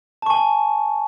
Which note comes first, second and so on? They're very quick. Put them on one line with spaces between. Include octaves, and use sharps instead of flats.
A5 C#6 G#5